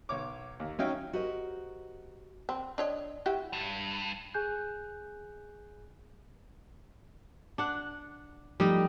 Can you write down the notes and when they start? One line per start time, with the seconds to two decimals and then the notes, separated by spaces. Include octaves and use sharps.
0.09 B1 C#5 D6
0.60 D#2
0.79 F#3 C#4 D#4 E5 F5 G5
1.13 F#4 G4 A#4 C5 D#5
2.49 C4
2.78 D4 C#5 D#5
3.26 E4 F#4 G4
3.53 G2
4.34 G#4 G#5 F#6 G6
7.58 D4 F#5
8.60 F3 G3 A3 D#4